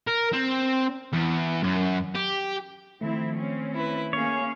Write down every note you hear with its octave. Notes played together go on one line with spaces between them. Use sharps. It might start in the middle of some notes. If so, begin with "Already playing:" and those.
A#4
C4
E2
F#2
G4
D#3 F3 A3 C4 E4
C4 C#4
E4 B4
A#3 C#4 G#4 C#5 F5